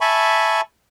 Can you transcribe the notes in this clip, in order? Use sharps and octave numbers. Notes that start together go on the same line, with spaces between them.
E5 G#5 A5 B5 C#6